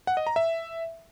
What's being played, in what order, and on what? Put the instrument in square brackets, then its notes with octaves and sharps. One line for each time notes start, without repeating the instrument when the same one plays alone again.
[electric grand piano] F#5
D#5
A#5
E5